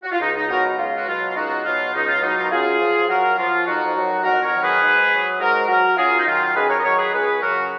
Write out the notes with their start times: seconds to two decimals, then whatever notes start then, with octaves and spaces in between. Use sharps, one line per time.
0.03 F#4
0.12 F4
0.20 C#2 D#4
0.35 D#4
0.49 B2 F#3 F#4 A#4
0.78 C#2 F4
0.97 F#4
1.07 B2 F#3 F4
1.28 F4
1.35 C#2 D#4 F#4
1.65 B2 F#3 F4
1.93 C#2 D#4
2.08 F4
2.22 B2 F#3 D#4
2.36 F4
2.44 A#4
2.50 F#2 F4 G#4
2.80 F3
3.08 F#2 F#4 A#4
3.38 F3 F4
3.66 F2 D#4 F#4
3.96 D#3 F#3
4.24 F2 F#4 A#4
4.43 A#4 C#5
4.53 D#3 F#3
4.62 G#4 B4
4.81 G#2
5.11 F#3
5.39 G#2 F#4 A#4
5.68 F#3 F#4 A#4
5.97 F#2 F4 G#4
6.19 D#4
6.26 D#3 F#3 F4
6.56 F#2 G#4 B4
6.69 A#4 C#5
6.79 D#5
6.83 D#3 F#3 A#4 C#5
6.98 G#4 B4
7.12 C#2 G#4 B4
7.41 C#3 F#3 F#4 A#4